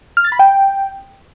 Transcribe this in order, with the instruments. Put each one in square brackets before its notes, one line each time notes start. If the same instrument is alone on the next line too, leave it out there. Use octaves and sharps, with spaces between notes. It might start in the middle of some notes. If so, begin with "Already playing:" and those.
[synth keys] F6
A6
B5
G5